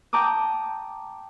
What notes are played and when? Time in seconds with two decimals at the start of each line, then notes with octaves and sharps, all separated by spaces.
0.13 G5 A5 A#5 D6 D#6